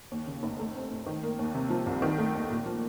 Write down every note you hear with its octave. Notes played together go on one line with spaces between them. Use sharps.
D#2
C#3
F1
A3
C4
A2
D#3
A#3
D#2
C3
F3
C2
D#3
A3
D#2
A#2
F3